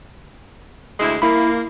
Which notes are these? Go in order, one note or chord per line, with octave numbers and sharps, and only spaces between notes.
D2 G#3 E4
A#3 E4 B5